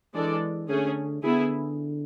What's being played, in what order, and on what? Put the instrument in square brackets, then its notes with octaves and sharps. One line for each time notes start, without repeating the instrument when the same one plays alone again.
[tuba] E3 [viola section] G#3 D4 A4 D5
[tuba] D3 [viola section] A3 C#4 G#4
[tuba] D3 [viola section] B3 E4 G#4